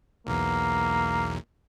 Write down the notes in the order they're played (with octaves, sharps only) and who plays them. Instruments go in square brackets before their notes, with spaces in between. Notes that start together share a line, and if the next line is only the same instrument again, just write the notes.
[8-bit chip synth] B1 E2 [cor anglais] A#3